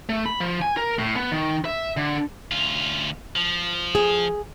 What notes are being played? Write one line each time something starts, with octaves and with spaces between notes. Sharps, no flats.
A3
B5
F3
G#5
A#4
A2
B3
D#3
E5
D3
D2 F4
F3
G#4